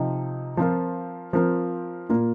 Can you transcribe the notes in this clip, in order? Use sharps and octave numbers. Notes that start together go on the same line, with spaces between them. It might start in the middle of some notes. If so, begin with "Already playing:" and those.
Already playing: C3 F3 D#4
F3 C4 F4 A#4
F3 C4 F4 A#4
A#2 A#3 F4 A#4